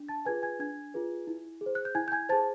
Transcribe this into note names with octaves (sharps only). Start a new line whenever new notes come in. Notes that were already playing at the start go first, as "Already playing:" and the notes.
Already playing: D4
A5 A6
F4 G#4 B4 G#5 G#6
G#5 G#6
D4 G#5 G#6
F4 G#4 B4
E4
G#4
C5
F#6
G6
E4 G#5 G#6
G6
G#5 G#6
G#4 C5 A5 A6